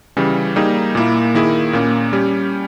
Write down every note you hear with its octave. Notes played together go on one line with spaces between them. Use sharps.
C#3 E3 G3 C#4
G3 A#3 D#4 G#4
A#2 A#3 E4
D#3 A#3 E4 G#4
A#2 A#3 C#4
G3 C#4 G4